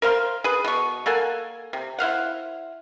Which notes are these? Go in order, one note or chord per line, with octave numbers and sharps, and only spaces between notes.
A#4 C5 F5 C6
G#4 B4
B2 B3 C#6
A#3 A4 F#5 G#5
C3
E4 C5 F5 F#5